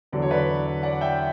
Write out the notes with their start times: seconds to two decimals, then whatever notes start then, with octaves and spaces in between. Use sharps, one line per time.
0.12 E2 D3 F#3 D5
0.22 C#5
0.30 B4 D5
0.83 D5 F#5
1.01 E5 G5